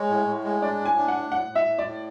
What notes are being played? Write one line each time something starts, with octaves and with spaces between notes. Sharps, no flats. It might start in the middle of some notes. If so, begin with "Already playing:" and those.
Already playing: G#3 C#5
A2
A2
G#3
D4 D5
A2
G#5
D4
F#5
A2
A2 F#5
A2
E5
A2
D5
A2